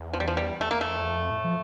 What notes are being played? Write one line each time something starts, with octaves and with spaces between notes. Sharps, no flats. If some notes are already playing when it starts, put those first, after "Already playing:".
Already playing: E2
F3
G3
F3
G3
E2 A3
E2 A#3
F2 A3
E2
F2
A2
F3